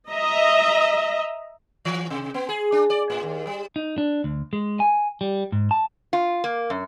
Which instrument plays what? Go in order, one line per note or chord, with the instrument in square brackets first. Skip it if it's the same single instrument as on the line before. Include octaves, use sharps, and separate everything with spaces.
[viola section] D#5 E5 A#5
[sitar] E3
C3
B3
G#4
D4
D5
A2
D#2
G3
[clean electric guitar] D#4
D4
D2
G#3
G#5
G3
G#2
A5
[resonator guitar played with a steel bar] F4
A#3
F#2